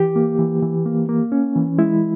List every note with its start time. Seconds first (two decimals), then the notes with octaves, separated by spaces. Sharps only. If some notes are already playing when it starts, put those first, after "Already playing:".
Already playing: E3 G4
0.16 A#3
0.39 E3
0.63 E3
0.85 A#3
1.09 A#3
1.32 C#4
1.56 E3
1.78 G#3 E4